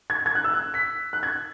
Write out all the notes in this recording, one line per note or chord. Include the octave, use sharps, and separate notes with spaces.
G#6
G#6
F#6
E6
F#6
B6
F#6
G#6